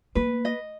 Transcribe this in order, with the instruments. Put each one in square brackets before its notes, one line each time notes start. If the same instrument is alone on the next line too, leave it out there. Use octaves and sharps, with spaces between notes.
[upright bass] A#3 [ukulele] B4
[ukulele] D#5